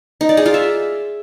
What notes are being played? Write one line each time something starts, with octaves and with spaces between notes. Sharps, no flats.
D#4
D5
G#4
F4
E5